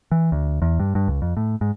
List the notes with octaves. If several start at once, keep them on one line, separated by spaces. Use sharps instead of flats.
E3
D2
E2
G2
G2
C#2
F2
A2
G#2